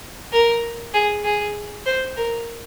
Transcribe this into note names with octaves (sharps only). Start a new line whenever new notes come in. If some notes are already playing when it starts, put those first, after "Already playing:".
A#4
G#4
G#4
C5
A#4